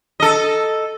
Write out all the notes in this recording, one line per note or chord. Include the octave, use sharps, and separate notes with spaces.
A4 D#5